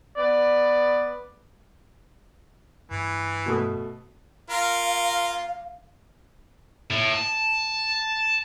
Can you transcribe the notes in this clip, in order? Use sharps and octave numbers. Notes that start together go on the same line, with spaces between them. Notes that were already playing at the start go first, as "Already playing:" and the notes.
B3 B4 D5
G2 E3
B2 A3 D#6
F4 A#4 F5
A2
A5